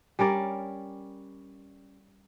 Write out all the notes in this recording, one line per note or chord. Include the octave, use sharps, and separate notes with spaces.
G3 C#4 A#4 D5